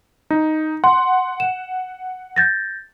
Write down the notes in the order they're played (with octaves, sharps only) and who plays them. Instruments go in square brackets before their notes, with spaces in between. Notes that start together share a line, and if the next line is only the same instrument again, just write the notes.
[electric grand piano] D#4
[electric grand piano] F#5 [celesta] C6
[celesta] E7
G6 A6 A#6